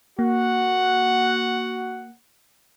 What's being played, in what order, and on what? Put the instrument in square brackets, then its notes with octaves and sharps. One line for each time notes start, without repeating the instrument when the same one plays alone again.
[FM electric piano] A#3 [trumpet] F#4 [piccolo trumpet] F#5